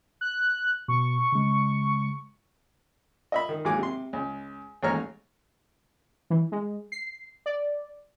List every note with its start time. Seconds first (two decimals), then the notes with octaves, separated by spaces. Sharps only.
0.21 F#6
0.88 B2 C#6
1.32 C#3 G#3
3.32 D#5 E5 B5
3.49 D#3
3.65 D#2 G#2 F#3 G#4 G#5 D6
3.79 C3 C6
4.13 C#2
4.83 A1 D#2 G#2 C#5 A#5 F6
6.30 E3
6.52 G#3
6.92 C7
7.46 D5